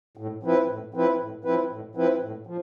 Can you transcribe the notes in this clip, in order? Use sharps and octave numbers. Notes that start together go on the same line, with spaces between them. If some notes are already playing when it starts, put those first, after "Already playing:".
A2
F3 C4 E4 B4
A2
F3 C4 E4 B4
A2
F3 C4 E4 B4
A2
F3 C4 E4 B4
A2
F3